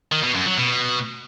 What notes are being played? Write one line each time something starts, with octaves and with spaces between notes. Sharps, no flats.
D#3
B2
F#2
F#3
B2